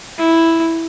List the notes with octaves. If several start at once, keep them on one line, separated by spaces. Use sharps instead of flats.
E4